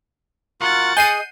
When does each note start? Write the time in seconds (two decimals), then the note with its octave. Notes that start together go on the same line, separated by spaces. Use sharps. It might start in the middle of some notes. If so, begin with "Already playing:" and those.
0.61 F4 F#4 A#4 F#5 A6
0.97 G#4 D#5 G#5 G6 C7 D#7